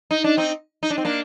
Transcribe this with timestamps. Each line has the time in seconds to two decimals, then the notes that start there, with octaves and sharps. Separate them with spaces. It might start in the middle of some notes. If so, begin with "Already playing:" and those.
0.11 D#4
0.24 D4
0.37 C4 D#4
0.83 D#4
0.90 D4
0.98 C4
1.05 A#3 D4